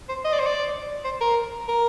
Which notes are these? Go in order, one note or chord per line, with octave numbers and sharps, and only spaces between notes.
C5
D#5
D5
C5
D5
C5
A#4
A#4